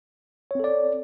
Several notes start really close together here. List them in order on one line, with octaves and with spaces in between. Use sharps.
C#5 C4 A4 D5